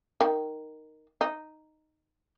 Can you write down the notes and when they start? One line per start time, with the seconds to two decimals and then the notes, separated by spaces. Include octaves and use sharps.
0.21 D#3
1.21 D#4